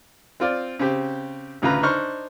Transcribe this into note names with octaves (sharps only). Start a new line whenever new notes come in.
C4 F4 D5
C#3 C4 G4
A1 D2 C#3 F4 B4 A#5
D4 D#4 C5 C#6 F6